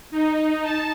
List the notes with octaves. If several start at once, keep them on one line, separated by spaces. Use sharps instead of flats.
D#4
A5